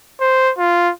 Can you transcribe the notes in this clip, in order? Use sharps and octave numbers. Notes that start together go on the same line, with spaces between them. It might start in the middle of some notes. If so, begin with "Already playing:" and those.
C5
F4